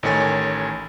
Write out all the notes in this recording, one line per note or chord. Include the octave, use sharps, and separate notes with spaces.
A1 D#3 A3 C#5 G#5 A6